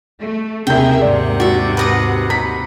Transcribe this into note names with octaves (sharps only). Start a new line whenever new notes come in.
A3
D#2 C3 G#4 A#4 E5 G5 G6
D#2 G#2 C3 D5 F#5
F#4 D5 E5
B4 D#5 D#6
A#5 B5 B6